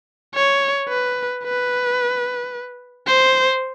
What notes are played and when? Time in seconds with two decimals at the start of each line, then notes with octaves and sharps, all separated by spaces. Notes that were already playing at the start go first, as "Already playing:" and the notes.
0.35 C#5
0.89 B4
1.44 B4
3.07 C5